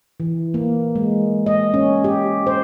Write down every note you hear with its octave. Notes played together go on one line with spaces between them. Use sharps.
E3
A#3
G#3
D#5
C#4
G4
C5